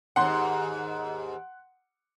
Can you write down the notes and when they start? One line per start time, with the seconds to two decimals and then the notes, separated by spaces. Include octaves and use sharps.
0.16 D#2 G#2 F#5 C6